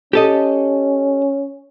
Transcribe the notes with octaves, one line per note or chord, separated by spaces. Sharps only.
C#4 G4 A4 D#5